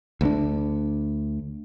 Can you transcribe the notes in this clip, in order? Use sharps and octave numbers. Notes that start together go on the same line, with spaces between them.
D2 G3 D4